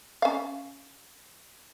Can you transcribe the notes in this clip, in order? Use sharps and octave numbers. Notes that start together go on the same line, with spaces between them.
C#4 F5